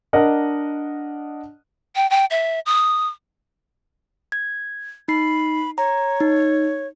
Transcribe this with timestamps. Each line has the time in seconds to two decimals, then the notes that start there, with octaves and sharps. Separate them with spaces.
0.13 D4 A#4 D#5 F#5
1.96 G5
2.10 G5
2.30 E5
2.66 D#6
4.32 G#6
5.08 D#4 B5 C7
5.78 C#5 A#5
6.20 D#4